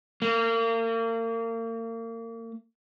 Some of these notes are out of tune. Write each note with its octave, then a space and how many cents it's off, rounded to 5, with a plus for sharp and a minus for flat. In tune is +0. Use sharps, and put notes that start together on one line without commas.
A#3 -35